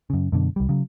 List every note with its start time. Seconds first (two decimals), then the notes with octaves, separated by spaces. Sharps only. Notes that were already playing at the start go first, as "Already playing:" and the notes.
0.10 F#2 C#3
0.32 F#2 B2 D3
0.56 C2 G3
0.69 C#3 F#3